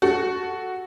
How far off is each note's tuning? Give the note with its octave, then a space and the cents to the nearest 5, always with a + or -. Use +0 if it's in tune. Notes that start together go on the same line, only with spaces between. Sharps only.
F#4 +0 A4 -5